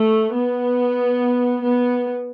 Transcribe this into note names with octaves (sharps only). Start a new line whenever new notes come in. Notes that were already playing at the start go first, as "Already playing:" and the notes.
Already playing: A3
B3
B3